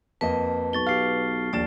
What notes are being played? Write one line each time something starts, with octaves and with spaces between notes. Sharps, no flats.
F2 A#3 B4 D#5 A5
B1 C#6 A6 G7
G4 F5 F6 C7
A#1 D#2 D5 A6 E7